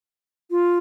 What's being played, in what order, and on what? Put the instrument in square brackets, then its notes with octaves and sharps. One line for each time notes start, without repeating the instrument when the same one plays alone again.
[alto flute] F4